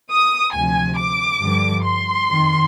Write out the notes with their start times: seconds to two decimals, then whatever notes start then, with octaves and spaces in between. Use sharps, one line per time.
0.11 D#6
0.53 D2 C3 F3 G#5
0.98 D6
1.41 G2 D3 F3
1.85 C6
2.28 F2 D#3